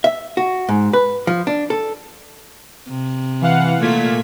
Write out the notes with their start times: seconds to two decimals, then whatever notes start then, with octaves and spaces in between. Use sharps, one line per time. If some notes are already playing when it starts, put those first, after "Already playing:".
0.04 E5
0.37 F#4
0.69 G#2
0.93 B4
1.27 F3
1.47 D4
1.70 A4
2.89 C3
3.41 E3 F5 F#5
3.81 A#2 A3 F4 G#6 B6